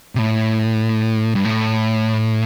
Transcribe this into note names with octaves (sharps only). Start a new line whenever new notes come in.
C3
A2
G2
A2